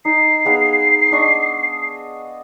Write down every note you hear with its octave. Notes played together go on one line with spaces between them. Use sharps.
D#4 C7
B3 G#4 F5
D4 D#5 C#6